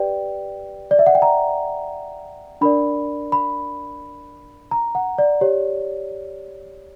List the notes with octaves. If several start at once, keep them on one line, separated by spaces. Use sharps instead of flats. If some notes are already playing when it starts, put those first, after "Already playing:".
Already playing: G4 B4 D5 G5
D5
E5
F#5
G5
A#5
D4 A#4 D5 B5
B5
A#5
F#5
D5
G4 C#5